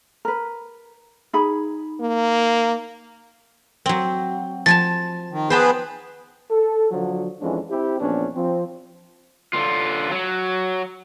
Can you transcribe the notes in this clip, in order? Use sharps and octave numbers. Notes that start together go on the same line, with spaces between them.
A#4 B4
D#4 G#4 B5
A#3
F#3 C4
F3 G#5 A5 A6
D#3
B3 G#4 B4 C5 G5 A5
A4
D3 F3 F#3
F2 E3 G#3 C#4 D4
C4 E4 G4
A#1 E2 B3 C#4 D4
F3 C4
D3 F4
F#3